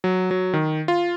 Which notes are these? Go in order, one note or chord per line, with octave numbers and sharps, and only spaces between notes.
F#3
F#3
D#3
F4